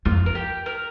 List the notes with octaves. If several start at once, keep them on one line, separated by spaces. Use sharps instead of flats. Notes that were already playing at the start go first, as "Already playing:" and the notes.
F2 F4
A#4
G4
A#4